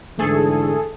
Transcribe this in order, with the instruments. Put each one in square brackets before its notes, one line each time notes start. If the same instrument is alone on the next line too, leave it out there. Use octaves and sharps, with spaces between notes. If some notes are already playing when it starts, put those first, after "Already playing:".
[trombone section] G#2 D3 E3 [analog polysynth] A3 G#4 A4